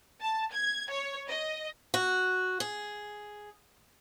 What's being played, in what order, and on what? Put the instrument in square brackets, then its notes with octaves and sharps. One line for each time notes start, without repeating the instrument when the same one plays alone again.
[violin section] A5
G#6
C#5
D#5
[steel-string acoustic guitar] F#4
G#4